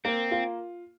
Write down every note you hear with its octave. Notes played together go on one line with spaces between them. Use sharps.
A#3 C4
F4